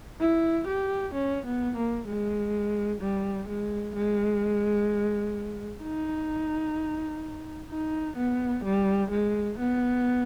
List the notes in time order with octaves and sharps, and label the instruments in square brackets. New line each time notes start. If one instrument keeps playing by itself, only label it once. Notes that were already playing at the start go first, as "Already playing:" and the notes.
[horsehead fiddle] E4
G4
C#4
B3
A#3
G#3
G3
G#3
G#3
D#4
D#4
B3
G3
G#3
B3